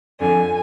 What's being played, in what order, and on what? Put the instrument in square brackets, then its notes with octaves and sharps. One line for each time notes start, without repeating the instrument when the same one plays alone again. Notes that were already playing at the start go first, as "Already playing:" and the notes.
[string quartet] F2 D3 G#5